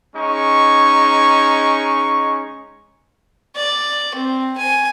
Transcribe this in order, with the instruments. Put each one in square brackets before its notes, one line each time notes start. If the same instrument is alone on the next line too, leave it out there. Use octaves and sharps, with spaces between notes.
[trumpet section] G#3 C#4 D#4 C#6
[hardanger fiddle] D5
C4
G#5